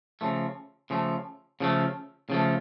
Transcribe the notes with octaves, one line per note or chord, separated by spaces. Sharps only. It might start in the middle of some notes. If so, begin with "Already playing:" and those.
C#3 F3 A3
C#3 F3 A3
C#3 F3 A3
C#3 F3 A3